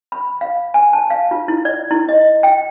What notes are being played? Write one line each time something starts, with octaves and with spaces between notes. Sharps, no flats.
B5
F5
G#5
A5
F5
F4
E4
D5
E4
D#5
G5